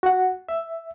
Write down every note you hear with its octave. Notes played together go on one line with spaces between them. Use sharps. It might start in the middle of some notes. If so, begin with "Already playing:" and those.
F#4 F#5
E5